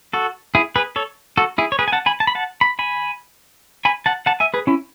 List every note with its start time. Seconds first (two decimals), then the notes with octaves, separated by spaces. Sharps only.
0.13 F#4 A4
0.55 E4 G#4
0.76 G#4 B4
0.96 A4 C#5
1.37 F#4 A4
1.58 E4 G#4
1.72 C#5
1.79 G#4 B4
1.88 G#5
1.92 F#5 A5
2.06 G#5 B5
2.20 A5
2.27 B5
2.35 F#5 A5
2.61 B5
2.79 G#5 B5
3.85 G#5 B5
4.06 F#5 A5
4.26 F#5 A5
4.40 E5 G#5
4.54 G#4 B4
4.67 C#4 E4